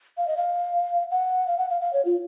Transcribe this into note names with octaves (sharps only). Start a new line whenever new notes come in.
F5
D#5
F5
F#5
F5
F#5
F5
F5
C#5
F4